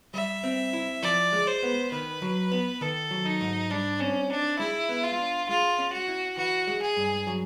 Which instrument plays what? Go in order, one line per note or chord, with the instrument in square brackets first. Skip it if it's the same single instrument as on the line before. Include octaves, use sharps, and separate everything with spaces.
[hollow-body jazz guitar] G3 [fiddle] E5
[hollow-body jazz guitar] C4
E4
[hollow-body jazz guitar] F3 [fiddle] D5
[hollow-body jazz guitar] G#3
[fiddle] C5
[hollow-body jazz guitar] B3
[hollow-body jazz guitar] D#3 [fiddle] B4
[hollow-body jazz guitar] F#3
B3
[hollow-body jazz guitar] D#3 [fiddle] A4
[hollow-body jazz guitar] F#3
[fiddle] D#4
[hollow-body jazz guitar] G#2
[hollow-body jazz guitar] G3 [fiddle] D4
[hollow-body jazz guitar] C4 [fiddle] C#4
[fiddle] D4 [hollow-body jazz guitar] D#4
[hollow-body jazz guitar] G#3 [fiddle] E4
[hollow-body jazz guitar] B3
[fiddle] F4
[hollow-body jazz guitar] D4
[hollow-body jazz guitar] G#3 [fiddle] F4
[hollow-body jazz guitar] C#4
[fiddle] F#4
[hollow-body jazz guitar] E4
[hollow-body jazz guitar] E3 [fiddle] F#4
[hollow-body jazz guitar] G#3
[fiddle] G#4
[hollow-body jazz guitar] G2
F#3